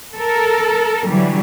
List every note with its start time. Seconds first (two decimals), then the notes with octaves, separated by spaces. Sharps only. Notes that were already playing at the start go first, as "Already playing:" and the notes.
0.15 A4 A#4
1.08 D3 E3 F#3 G3